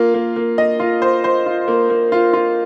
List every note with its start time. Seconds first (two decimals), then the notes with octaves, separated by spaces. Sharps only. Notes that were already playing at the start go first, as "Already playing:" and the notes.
Already playing: A#3 F4
0.14 A#3
0.36 A#3
0.58 D#5
0.80 F4
1.02 C5
1.24 C5
1.46 F4
1.68 A#3
1.90 A#3
2.12 F4
2.33 F4